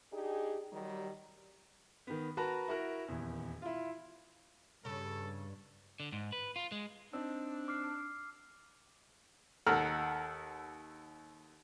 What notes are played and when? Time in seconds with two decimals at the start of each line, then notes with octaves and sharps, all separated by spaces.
0.12 D4 D#4 G4 G#4
0.72 D#3 F#3 G3
2.07 D#3 B3
2.37 F#4 A#4 B4 A5 A#5
2.68 E4 F#4 A#4
3.08 D#1 E2
3.62 E4 F4
4.85 G2 C#3 A4
6.00 D3
6.12 G#2
6.32 B4
6.56 F4
6.72 G#3
7.13 C4 D4 D#4 E6
7.68 D6 F6 C7
9.66 D#2 A4 F#5 A#5 F6